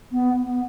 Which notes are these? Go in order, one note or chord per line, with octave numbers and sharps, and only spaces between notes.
B3
B3